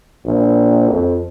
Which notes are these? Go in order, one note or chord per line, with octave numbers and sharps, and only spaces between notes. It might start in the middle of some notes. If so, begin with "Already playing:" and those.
A#1
F2